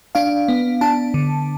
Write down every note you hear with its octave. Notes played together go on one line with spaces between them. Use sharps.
D4 F5
B3
D4 A5
D3